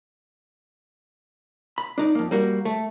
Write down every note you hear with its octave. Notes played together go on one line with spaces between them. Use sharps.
B5
D4 D#4 D5
F2 A#3
G3 A#3 F#4
A3